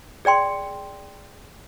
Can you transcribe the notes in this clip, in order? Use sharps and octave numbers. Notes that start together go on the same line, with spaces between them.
G#4 D5 G5 C6